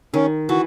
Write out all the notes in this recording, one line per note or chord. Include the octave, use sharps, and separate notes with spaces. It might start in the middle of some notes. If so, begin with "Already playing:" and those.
D#3 C#4
E3 F#4